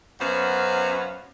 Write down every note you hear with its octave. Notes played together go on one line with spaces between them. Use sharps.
F#2 B3 C#4 C5 F5 F#5